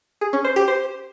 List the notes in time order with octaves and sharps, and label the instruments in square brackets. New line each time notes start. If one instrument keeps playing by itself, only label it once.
[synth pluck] G#4
C#4
C5
G4
C5